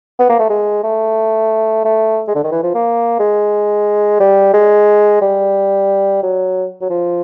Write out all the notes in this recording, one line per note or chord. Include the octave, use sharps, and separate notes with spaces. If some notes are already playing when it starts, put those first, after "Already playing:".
B3
A#3
A3
G#3
A3
A3
G#3
D3
D#3
E3
F3
A#3
G#3
G3
G#3
G3
F#3
F#3
F3